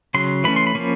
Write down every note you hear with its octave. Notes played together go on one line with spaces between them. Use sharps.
C#3 F#3 C6
E3 A3 C#4 B5
C6
B5
F3 A#3 C#4